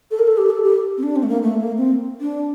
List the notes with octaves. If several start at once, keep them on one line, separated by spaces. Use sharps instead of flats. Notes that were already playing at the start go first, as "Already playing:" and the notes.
A4
A#4
A4
G4
A4
G4
C4
D4
C4
A3
A#3
A3
A#3
C4
D4